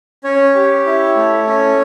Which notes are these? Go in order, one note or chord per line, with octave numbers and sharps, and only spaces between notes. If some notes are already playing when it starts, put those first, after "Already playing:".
C#4 C#5
G4
E4
A3
C#4